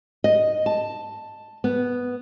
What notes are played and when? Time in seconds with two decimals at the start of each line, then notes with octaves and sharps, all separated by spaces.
0.24 D#5
0.66 A5
1.64 B3